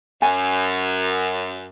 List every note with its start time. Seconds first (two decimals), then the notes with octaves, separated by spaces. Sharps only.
0.22 F#2 G#5